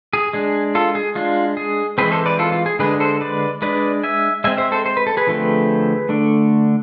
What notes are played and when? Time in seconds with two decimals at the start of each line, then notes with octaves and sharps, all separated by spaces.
0.13 G#4
0.33 G#3 D4 G#4
0.75 F4 A4
0.95 G#4
1.15 G#3 D4 F4
1.57 G#4
1.98 E3 G#3 C4 G#4 B4
2.12 A4 C5
2.26 B4 D5
2.39 F4 A4
2.52 F4
2.66 G#4
2.79 D3 G#3 D4 G#4 B4
3.00 A4 C5
3.21 B4 D5
3.62 G#3 D4 B4 D5
4.04 E5 G#5
4.44 G#3 C4 E5 G#5
4.58 C5 E5
4.72 A4 C5
4.86 C5
4.97 B4
5.07 A4
5.17 G#4 B4
5.27 D3 F3 A3 C4
6.09 D3 A3 D4